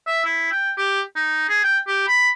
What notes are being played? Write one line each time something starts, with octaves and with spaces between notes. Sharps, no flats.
E5
E4
G5
G4
D#4
G#4
G5
G4
B5